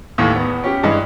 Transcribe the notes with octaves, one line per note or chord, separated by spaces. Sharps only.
D#2 A2 E3
E2 B3
C#4 G4
G2 E3 G#3